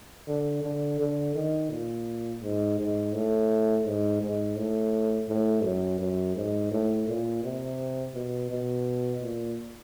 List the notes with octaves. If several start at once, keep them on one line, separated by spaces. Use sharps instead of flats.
D3
D3
D3
D#3
A#2
G#2
G#2
A2
G#2
G#2
A2
A2
F#2
F#2
G#2
A2
A#2
C3
B2
B2
A#2